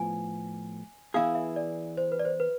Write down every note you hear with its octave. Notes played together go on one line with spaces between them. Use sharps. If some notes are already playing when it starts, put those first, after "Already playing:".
Already playing: A2 F3 B3 G#5
E3 B3 E4 G#4 F5
E5
D5
C5
B4
D5
C5
B4